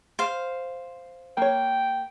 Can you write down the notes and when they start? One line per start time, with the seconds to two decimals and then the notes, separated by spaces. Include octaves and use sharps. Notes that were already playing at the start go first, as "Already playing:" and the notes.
0.19 C5 F5
1.37 A#3 C#5 G5